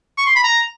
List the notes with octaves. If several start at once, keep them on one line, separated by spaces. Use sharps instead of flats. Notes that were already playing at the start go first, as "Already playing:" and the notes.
C#6
C6
B5
A#5